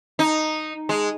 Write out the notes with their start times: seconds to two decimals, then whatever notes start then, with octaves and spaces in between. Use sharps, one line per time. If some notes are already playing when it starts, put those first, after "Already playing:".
0.19 D#4
0.89 G#3